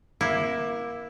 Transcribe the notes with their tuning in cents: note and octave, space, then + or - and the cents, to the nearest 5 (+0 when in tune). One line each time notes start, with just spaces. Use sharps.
A#3 +20 E4 +0